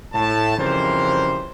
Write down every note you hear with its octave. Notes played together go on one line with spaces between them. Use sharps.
A2 A5
F2 C#3 E3 G3 A#4 C5